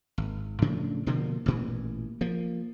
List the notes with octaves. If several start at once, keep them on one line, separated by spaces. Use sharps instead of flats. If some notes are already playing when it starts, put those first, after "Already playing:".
G#1
A2 C#3 F3 D4
B2 D3 F3 A#3
A1 A#2 E3
F3 A#3